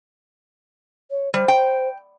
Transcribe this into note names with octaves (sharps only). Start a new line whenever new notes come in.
C#5
G3 C5
G5